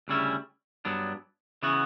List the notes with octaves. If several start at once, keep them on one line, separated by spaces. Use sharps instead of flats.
D2 C#3 G3 C#4 E4
G2 F#3 B3 D4
C#3 E3 B3 F#4